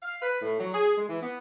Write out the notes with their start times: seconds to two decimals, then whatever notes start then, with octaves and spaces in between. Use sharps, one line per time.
0.03 F5
0.22 B4
0.41 A2
0.60 F#3
0.74 G#4
0.97 G#3
1.09 E3
1.22 B3